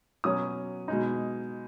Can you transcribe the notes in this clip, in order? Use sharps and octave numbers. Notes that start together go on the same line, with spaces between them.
B2 F#3 C#4 D#6
B2 G#3 D#4